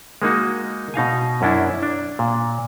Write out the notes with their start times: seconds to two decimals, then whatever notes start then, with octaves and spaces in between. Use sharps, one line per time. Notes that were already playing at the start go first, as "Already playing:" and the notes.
0.22 G#3 A#3 D#4 F#4
0.94 B2 D#4 F5 G#5
1.42 F#2 C#4 D4 E4
1.83 D4
2.19 A#2